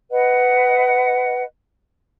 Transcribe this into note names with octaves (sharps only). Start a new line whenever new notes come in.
B4 D#5 F#5